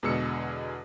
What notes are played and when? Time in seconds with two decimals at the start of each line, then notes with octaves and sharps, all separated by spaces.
0.03 E2 B2 D3 G#3 E6 C#7